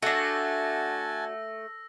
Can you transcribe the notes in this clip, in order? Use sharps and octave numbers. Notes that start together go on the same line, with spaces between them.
A3 D4 F#4 F#5 G#5 A5 E6 A#6